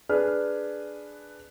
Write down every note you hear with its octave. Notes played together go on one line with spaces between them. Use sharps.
D4 G#4 B4 F6